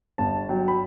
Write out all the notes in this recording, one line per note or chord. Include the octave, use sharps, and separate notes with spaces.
G1 A5
F#3 G5
B5